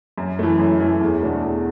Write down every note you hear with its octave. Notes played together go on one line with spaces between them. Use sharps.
F#2
E3 A3
F#2
E3 A3
E2
B2 A3 D4 F#4
E2